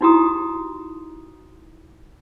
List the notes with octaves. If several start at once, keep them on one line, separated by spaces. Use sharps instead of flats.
D#4 E4 F#4 G4 A#5 D#6